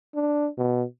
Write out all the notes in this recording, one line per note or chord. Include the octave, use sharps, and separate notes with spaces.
D4
B2